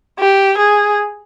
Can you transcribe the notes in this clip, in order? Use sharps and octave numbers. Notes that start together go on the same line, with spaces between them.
G4
G#4